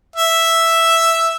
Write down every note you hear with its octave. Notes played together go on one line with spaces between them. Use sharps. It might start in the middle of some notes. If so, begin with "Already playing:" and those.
E5